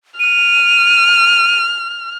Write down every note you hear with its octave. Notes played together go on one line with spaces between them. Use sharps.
F6 D#7